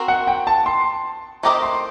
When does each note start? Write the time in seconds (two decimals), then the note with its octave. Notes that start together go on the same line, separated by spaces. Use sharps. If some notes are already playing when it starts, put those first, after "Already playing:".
Already playing: C4 F#4 A#4
0.08 F#5
0.27 G5
0.47 A5
0.66 C6
1.43 A3 C4 G4 A#4 D#5 A#5
1.63 C6